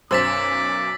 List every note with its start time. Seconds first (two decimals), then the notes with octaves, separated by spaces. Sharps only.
0.11 B1 F#2 C5 D6 E6 A6 B6 E7